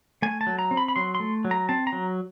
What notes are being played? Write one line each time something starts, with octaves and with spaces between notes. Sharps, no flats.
A3 G#5
A5
F#3
A#5
C4
B5
B5
F#3 C6
C6
A3
F#3
A#5
C4 A5
A#5
F#3